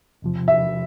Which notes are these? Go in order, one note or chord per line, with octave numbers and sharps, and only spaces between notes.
E2 C3 F3
E5